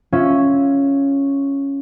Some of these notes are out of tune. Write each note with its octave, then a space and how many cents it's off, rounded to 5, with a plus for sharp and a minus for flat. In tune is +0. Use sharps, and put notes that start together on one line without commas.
C#4 +0 F4 +0 E5 +0